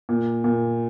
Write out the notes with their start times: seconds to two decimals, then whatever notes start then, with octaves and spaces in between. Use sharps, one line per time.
0.09 A#2
0.44 A#2